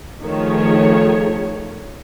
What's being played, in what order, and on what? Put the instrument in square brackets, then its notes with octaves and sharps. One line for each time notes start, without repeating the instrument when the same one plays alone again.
[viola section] D#3 F3 A3 G#4 C#5